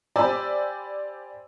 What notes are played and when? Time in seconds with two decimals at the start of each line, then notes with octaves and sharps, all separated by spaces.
0.16 G4 C5 D5 G#5 B5 E6